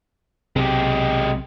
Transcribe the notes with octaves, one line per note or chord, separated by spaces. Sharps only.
B1 C3 G#3 G4